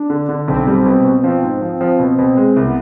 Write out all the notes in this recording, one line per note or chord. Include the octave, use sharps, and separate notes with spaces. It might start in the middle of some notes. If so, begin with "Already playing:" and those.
Already playing: D4
D3
D3
B1 C4
G3
B2
B2
F3 C4
G#2
F3
F3
B2
B2
G#3
C2
B3